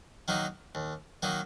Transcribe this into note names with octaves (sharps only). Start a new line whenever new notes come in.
D#3 F#3 A#3 D#4
D#2
D#3 F#3 A#3 D#4